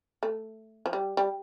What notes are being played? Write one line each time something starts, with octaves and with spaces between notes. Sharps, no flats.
A3
F3
G3
G3